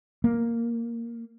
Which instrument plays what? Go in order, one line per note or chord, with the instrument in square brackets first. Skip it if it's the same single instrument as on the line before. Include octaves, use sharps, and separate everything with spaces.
[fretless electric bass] A#3